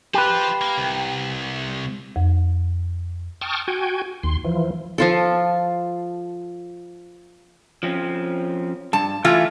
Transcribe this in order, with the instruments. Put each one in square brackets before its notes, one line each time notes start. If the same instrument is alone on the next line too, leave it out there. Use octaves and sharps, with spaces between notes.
[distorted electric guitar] F4 C5 [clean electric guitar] G4 B4
[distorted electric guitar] A#3
C2
[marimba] F2
[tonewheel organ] G5 A5 C#6 D#6 F6
F#4 G5 G#5
D#2 C6
E3 F3
[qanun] F3 F4 A4
[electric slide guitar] F3 C4 C#4
[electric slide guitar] G2 [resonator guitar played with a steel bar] A5
[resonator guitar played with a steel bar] E3 F4 [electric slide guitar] A3